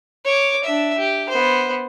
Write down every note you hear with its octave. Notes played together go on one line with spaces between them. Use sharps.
C#5 D6
D4 E5
G4
B3 C5